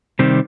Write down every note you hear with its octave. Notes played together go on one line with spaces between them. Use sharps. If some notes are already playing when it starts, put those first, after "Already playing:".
C3 D#3 G3 C4